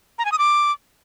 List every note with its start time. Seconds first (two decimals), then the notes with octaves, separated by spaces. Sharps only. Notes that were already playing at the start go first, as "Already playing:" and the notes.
0.19 A#5
0.25 G#5
0.32 D#6
0.39 D6